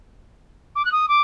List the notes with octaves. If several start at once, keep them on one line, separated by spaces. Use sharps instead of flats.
D6
F#6
D#6
D6